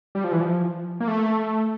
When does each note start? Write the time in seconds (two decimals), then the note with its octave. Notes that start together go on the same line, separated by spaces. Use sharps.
0.15 G3
0.24 F3
0.32 E3
0.41 F3
1.00 A#3
1.08 A3